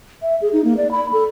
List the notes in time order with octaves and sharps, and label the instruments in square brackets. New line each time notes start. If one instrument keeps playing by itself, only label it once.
[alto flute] E5
G#4
D#4
A#3
D5
B5
A4